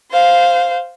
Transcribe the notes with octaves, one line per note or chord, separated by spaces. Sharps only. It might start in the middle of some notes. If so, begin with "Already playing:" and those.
C5 F5